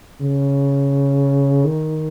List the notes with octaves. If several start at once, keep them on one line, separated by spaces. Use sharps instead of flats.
C#3
D#3